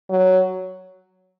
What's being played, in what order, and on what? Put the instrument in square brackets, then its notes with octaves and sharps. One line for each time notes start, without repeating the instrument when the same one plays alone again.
[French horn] F#3